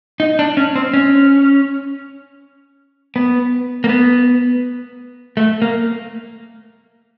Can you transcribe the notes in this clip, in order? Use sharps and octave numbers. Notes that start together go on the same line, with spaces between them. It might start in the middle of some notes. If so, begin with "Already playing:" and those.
D#4
D4
C#4
C4
C#4
B3
A#3
B3
A3
A#3